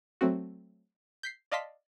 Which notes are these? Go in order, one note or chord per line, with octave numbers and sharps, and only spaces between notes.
F#3 A3 C4 F#4
G6 B6 C7
D5 D#5 F5 A5 C6 B6